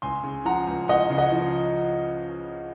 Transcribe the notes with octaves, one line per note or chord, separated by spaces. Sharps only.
C#2 G#5 C6
C#3
F3 F#5 A#5
C#2
C#2 D#5 F#5
C#3
D#5 F#5
F3